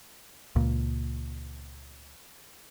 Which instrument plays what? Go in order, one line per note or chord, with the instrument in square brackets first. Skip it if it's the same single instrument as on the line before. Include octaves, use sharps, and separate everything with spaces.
[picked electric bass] C#2 A#2